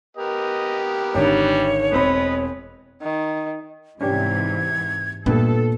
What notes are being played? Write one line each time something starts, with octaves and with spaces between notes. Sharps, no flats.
B3 G4 A#4 D#5
G#1 D3 D#3 G3 C#5
E1 C4 B4 D#5 B5 D#6
D#3
G#2 C3 E3 C#4 D4 G4 G#6
G2 A#2 A3 B3 A4